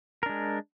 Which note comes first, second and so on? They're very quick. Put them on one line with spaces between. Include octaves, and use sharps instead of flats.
A#4 D4 G#3